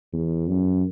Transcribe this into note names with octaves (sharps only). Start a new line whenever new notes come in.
E2
F#2